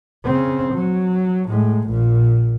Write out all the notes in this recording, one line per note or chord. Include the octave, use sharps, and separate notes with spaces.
C#3 C4
F#3
A2 G#3
A#1 A#2